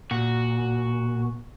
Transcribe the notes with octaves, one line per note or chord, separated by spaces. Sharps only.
A#2 F#4